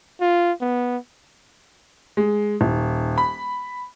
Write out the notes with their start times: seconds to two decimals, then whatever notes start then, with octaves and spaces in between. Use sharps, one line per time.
0.21 F4
0.61 B3
2.17 G#3
2.61 D#1
3.18 B5